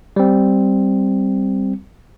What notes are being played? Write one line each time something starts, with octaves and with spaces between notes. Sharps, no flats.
G3 C4